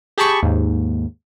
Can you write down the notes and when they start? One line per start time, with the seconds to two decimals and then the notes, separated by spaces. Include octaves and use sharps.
0.18 G4 G#4 A5 B5 C#6
0.43 D#2 G#2